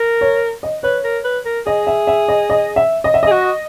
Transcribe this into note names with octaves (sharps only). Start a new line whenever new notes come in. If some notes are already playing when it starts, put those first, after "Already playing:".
Already playing: A#4
C#5
D#5
B4 C#5
A#4
B4
A#4
G#4 D#5
E5
E5
D#5
D#5
E5
D#5
E5
G#4 D#5
F#4